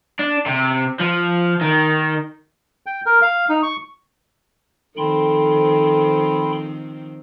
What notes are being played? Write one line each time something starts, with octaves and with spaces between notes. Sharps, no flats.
D4
C3
F3
D#3
G5
A#4
F5
D#4
C#6
D#3 F3 C4 A4 G5 B5 C6